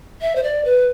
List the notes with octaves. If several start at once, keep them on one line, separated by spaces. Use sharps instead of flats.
E5
C5
D5
B4